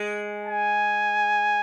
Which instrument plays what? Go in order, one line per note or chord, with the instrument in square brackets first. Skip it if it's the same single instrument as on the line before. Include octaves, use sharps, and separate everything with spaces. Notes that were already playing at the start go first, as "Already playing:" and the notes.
Already playing: [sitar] G#3
[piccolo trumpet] G#5